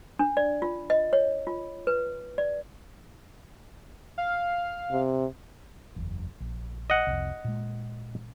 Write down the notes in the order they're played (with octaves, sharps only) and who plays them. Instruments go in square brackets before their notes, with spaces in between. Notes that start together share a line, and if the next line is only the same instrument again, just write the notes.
[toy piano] D4
D5
F4
D#5
C#5
F4
B4
D5
[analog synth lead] F5
[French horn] C3
[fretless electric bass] F#1 E2
A#1
[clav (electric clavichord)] D#5 F#5
[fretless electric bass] C2 F2
A#2 G#3